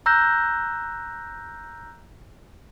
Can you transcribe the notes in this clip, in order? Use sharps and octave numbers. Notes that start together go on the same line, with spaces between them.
A#5 E6 F#6 G6 A#6